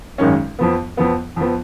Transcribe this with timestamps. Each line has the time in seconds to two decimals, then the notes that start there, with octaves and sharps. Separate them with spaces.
0.18 G#1 F#2 D#3 G#3 C#4
0.59 F2 F3 B3
0.97 F2 F3 B3
1.36 F2 F3 B3